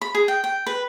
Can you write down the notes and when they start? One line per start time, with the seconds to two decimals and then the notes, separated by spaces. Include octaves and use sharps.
0.01 B5
0.15 G#4
0.28 G5
0.44 G5
0.66 B4